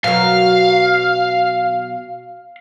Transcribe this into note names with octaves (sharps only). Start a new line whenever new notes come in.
B2 F#3 A#4 F5